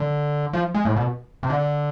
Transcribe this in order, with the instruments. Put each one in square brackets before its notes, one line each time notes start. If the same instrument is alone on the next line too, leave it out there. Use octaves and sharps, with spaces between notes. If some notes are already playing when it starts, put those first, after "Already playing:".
Already playing: [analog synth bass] D3
F3
G#3
A2
B2
C3
D3